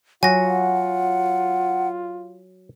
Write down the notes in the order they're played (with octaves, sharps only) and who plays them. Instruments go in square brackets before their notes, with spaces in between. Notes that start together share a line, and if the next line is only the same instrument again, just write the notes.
[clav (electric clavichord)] F#3 F#4 [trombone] F4 [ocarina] F#5 [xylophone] G#5 A#6